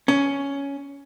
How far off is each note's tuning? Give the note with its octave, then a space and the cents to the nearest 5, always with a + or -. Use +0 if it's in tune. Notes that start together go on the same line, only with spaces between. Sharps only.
C#4 +10